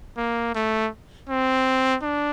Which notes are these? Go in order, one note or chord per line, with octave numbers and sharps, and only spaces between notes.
A#3
A3
C4
D4